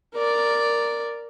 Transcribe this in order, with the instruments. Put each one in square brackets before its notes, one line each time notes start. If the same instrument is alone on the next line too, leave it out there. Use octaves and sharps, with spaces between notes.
[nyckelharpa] A#4 D5